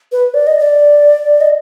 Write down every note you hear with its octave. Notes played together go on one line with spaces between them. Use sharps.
B4
D5
D#5
D5
D#5